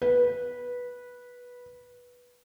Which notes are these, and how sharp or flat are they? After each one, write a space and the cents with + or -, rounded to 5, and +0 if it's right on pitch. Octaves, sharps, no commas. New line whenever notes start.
B4 -10